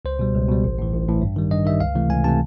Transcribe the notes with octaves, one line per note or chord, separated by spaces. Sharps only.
C#2 C5
B2 G3
C#2
B2 G3
A1
A2 E3
A1
A2 E3
G2
D#3 G3
G2 D#5
D#3 G3 E5
C#2 F5
C3 E3 A3
C#2 G#5
C3 E3 A3 A5